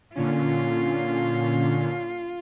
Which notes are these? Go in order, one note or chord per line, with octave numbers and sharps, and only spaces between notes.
A#2 D3 C#4 F4